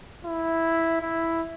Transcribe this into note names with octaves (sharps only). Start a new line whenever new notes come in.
E4
E4